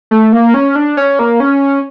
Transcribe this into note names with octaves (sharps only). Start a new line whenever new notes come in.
A3
A#3
C#4
D4
C#4
A#3
C#4